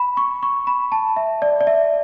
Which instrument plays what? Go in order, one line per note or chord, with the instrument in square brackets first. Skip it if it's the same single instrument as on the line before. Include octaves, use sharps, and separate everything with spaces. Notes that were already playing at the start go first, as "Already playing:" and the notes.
Already playing: [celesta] B5
C#6
C#6
B5
A5
E5
D5
D5
E5